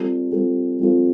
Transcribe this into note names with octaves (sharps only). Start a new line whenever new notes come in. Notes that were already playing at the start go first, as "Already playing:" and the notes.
Already playing: G3 C4 F4 A4
G3 C4 F4 A4
G3 C4 F4 A4